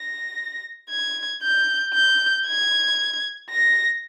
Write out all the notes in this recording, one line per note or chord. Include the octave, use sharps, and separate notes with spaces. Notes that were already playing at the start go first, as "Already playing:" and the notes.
Already playing: A#6
G#6
G6
G6
G#6
A#6